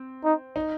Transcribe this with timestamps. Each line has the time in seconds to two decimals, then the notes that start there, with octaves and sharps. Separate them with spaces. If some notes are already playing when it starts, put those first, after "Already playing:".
Already playing: C4
0.24 D#4
0.56 D#4